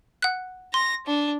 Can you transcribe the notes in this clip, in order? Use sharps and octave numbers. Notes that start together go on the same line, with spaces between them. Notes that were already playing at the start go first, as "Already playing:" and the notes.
F#5 F#6
C6 A#6
D4